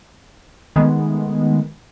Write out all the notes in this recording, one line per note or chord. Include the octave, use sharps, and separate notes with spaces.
D#3 G#3 A3 B3